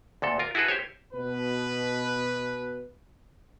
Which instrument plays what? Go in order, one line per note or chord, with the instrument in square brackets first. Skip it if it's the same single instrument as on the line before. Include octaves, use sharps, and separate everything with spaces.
[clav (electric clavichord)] D2 A#2 A4
F4 A#4
E4 F#4 G#4 A4 B4
G4 C5 C#5
[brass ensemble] B2 B4